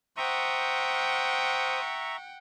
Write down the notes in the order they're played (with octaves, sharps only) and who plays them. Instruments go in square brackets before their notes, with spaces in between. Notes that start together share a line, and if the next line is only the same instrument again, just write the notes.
[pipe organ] C5 D#6 [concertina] E5 A#5 C#6 [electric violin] F#5 G5